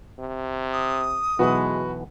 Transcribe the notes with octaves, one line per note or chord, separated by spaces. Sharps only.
C3
D#6
B1 E3 G#3 B3 F#4 B4